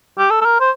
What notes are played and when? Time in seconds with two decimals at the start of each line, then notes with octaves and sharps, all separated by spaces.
0.18 G4
0.30 A4
0.41 A4
0.45 A#4
0.60 C5